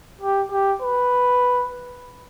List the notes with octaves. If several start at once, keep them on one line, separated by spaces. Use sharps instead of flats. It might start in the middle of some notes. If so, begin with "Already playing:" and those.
G4
G4
B4